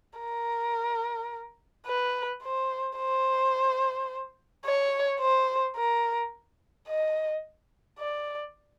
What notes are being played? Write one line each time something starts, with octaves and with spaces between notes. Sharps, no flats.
A#4
B4
C5
C5
C#5
C5
A#4
D#5
D5